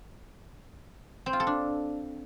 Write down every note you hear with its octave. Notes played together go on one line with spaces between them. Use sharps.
C4
F4
A4
D4